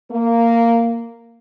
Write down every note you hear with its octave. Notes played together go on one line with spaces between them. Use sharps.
A#3